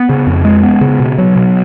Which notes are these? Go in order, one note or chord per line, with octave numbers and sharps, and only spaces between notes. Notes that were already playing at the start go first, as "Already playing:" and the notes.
Already playing: B3
C#3
F2
G#3
B3
C#3
B2
F#3
B2